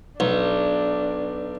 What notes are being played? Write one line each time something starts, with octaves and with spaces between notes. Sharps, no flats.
B1 D4